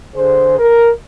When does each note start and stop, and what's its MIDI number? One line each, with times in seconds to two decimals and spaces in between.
0.15 0.55 50
0.15 0.55 68
0.15 0.55 72
0.59 0.90 70